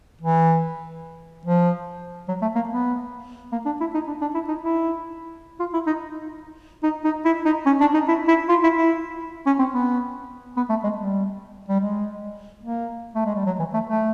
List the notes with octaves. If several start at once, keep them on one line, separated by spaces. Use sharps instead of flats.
E3
F3
F#3
A3
A#3
B3
A#3
D4
E4
D#4
D4
D4
E4
D#4
E4
F4
E4
D#4
D#4
D#4
E4
D#4
C#4
D4
D#4
E4
E4
F4
E4
E4
C#4
C4
B3
B3
A3
G#3
G3
G3
G#3
A#3
A3
G#3
G3
F#3
E3
A3
A3